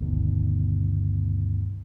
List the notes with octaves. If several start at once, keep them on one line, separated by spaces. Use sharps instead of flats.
G1 D2 B2 D#3